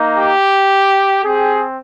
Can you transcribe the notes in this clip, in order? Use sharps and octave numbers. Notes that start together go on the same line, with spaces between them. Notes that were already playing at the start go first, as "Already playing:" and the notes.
Already playing: A#3 D#4
G4
C4 G4 G#4